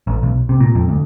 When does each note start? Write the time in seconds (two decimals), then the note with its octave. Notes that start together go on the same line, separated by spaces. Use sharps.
0.07 A1
0.23 B1
0.49 C3
0.60 A#2
0.75 F2
0.89 D2